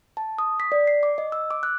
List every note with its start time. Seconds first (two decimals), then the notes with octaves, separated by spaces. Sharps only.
0.17 A5
0.38 D#6
0.60 B6
0.72 D5
0.87 C7
1.03 D6
1.18 D#5
1.32 E6
1.51 D6
1.63 F#6